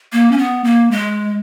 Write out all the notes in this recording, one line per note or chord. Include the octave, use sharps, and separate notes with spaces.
A#3
C#4
B3
A#3
G#3